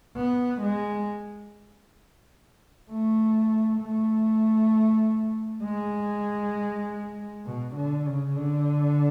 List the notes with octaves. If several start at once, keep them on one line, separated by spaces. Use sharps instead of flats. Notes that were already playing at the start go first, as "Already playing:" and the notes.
B3
G#3
A3
A3
G#3
B2
D3
C#3
D3